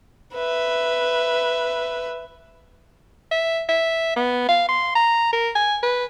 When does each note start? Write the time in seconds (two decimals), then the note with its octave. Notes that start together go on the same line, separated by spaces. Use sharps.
0.34 B4 E5
3.32 E5
3.69 E5
4.16 B3
4.49 F5
4.69 C6
4.95 A#5
5.33 A#4
5.56 G#5
5.83 B4